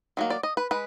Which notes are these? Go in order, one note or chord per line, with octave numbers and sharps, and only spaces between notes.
D#3 F#3 A#3
D5
D#5
B4
G#3 B4